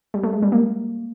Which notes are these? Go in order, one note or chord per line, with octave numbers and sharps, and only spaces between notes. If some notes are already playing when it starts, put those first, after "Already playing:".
G3
A3
G#3
G3
A#3